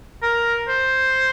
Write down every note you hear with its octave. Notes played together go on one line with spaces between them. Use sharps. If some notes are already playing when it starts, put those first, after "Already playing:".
A#4
C5